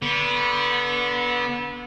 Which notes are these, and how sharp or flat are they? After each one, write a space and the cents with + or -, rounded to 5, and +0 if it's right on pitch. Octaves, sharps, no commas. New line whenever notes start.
D3 -25 B3 -25